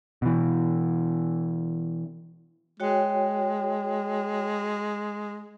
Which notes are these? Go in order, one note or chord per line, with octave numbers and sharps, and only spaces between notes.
B2 E3
G#3 F#4 C#5 G5